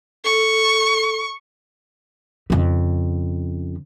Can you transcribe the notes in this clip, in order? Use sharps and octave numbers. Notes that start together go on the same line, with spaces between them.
A4 C#6
F2 C#3